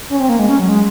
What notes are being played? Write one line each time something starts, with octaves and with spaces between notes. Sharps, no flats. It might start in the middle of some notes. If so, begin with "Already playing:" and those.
C#4
C4
A#3
G#3
C#4
F#3
G#3